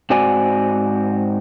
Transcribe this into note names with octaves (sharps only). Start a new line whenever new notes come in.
G#2 C4 F#4 D5 G#5